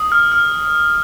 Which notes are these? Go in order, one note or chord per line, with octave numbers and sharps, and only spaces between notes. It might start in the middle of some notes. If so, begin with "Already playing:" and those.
Already playing: D#6
F6
F6